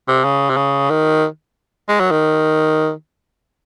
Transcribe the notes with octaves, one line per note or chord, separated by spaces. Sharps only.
C3
C#3
C3
C#3
D#3
G#3
F#3
D#3